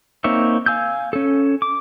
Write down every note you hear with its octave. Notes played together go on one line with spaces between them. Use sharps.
A#3 C4 D#4 C#5 E5
F5 G#5 E6 G6
C#4 A4
D6